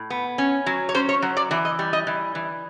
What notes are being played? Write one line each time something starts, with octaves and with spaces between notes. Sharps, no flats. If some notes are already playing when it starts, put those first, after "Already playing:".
Already playing: A2
B3
C#4
F#3
C#5
C#4 C5
C#5
F#3
D5
E3 D5
D#5
G3
D#5
E3
E3